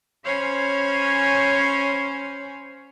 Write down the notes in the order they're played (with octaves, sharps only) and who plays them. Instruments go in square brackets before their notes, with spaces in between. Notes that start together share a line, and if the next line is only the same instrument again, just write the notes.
[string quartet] C#4 C5 C#5 F5 G#5 B5